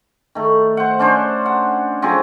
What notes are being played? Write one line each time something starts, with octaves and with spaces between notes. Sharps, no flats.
D#3 A3
C5 F#5
C#4 D4 C5
F#5
F3 F#3 C4 G#4